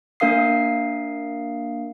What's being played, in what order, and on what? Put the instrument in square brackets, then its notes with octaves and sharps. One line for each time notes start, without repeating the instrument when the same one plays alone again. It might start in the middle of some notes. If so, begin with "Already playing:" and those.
[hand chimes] A#3 D4 A#4 F5 D#6 C7